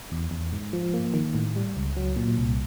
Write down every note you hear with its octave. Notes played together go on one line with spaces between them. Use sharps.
E2
E2
G#2
F3
A#3
D#3
A2
G3
C#2
F#3
A#2
C2